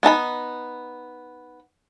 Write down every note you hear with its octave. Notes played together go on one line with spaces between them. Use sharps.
B3 D#4 A5 B5